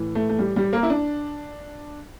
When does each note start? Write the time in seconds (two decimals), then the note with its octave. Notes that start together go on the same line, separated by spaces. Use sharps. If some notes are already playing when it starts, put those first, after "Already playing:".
Already playing: A2 E3
0.15 A3
0.29 A3
0.39 G3
0.56 G3
0.73 A#3
0.83 E4
0.90 D4